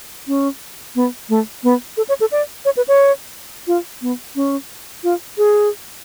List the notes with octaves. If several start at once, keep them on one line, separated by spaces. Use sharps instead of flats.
C#4
B3
A3
B3
A4
C#5
A4
D5
C#5
B4
C#5
F4
B3
C#4
F4
G#4